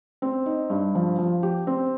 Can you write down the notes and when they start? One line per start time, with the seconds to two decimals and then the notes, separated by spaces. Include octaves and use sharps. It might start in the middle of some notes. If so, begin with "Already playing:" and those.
0.22 C4
0.46 D#4
0.70 G2
0.95 F3
1.19 F3
1.43 G4
1.67 C4